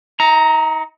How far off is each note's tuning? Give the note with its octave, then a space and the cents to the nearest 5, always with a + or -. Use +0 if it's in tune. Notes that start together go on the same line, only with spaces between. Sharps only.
D#4 +40 A#5 +0